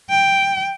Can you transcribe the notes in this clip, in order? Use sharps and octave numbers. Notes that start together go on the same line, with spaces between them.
G5